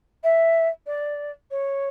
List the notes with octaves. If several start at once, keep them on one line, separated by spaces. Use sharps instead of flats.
E5
D5
C#5